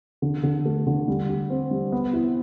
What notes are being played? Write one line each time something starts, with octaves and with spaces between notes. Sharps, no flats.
D3
D3
A3
D3
G3
G4
C4
G3
B3
E4